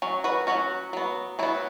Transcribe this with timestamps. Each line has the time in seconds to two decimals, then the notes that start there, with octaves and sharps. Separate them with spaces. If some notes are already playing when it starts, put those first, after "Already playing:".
0.02 F#3 C#4
0.24 F#4 B4
0.47 F#3 C#4 F#4
0.93 F#3 B3
1.39 F#3 B3 E4